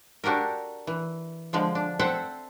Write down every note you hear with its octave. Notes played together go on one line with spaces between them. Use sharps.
D4 F#4 G4 A4 A#4
E3
D3 F3 G#3
D4
C4 A4 C5 E5 F#5 G5